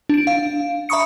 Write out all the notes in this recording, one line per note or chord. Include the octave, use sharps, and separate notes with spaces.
D4 D7
F5
E5 A#5 B5 C#6 D#6 C#7